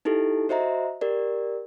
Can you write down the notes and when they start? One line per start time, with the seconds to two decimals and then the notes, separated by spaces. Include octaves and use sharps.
0.05 D#4 E4 G4 A4
0.49 F#4 C5 D#5 E5 A#5
1.01 G4 A#4 D5